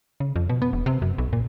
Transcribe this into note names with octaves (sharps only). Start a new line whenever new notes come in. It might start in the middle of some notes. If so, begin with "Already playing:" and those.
C#3
F2
B2
B3
E1
C3
F#2
B1
A#2